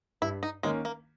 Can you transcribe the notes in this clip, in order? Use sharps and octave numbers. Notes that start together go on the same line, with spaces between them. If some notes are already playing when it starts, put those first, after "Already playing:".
G2 E4
D#4
D#3 G#3 A#3 C#4
A#3